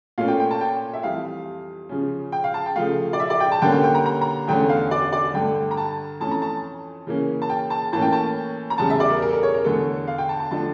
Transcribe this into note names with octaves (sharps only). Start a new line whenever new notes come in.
A#2 A3 C#4 F5
G5
G5
A5
G5
E5
F2 E3 G3 F5
C#3 F3 C#4
G5
F5
A5
G5
C#3 F3 A3 F5
D5
E5
D5
G5
A5
D3 G3 A#3 C#4 G5
G5
G5
A#5
A#5
A#5
E2 D3 A3 C#4 G5
F5
D5
D5
G2 D3 A3 G5
A#5
A5
F2 E3 A3 C#4 A5
A#5
A5
C#3 E3 A#3 C#4
A5
G5
A5
A2 E3 A#3 C#4 A5
G5
A5
A#5
E2 C#3 G3 A5
E5
D5
A#4
A#4
A4
A#4
C#5
A#4
E2 D3 A3 A4
F5
G5
A5
A5
D3 F3 A3 D4 A5